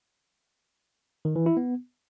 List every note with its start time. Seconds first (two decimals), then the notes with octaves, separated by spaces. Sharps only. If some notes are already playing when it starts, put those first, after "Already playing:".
1.25 D#3
1.36 E3
1.46 E4
1.57 B3